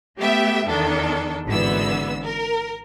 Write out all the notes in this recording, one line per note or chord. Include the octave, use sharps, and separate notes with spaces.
A3 B3 G4 E5 G5
E2 D#3 D4 A4
G#1 D3 E3 B3 E6
A#4